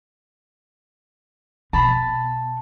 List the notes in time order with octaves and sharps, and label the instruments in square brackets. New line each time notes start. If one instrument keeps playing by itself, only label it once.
[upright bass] B2 [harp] A5 B5